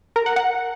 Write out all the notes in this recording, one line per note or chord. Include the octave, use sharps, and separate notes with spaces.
A#4
F#5
F#5